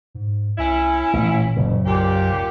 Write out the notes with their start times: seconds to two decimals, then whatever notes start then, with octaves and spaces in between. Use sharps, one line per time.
0.15 G#2
0.58 C2 C#4 E4
1.13 A1 A#2
1.57 F#1 C#3
1.86 B1 A#2 G4